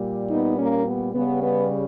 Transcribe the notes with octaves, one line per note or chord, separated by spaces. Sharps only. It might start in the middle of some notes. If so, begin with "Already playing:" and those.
Already playing: A#2 G3
B3 D#4
A#3 C#4
B3
C#3 G3 B3
B3